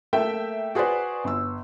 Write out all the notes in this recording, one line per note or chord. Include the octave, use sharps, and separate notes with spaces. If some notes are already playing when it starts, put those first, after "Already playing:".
A3 A#3 E5 G5
F#4 G#4 B4 C5 D5
G1 E6